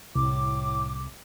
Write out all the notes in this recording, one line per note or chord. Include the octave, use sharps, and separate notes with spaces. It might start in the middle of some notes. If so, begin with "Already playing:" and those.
C2 A2 D6